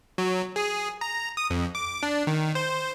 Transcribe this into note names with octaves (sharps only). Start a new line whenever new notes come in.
F#3
G#4
A#5
D#6
F2
D6
D4
D#3
C5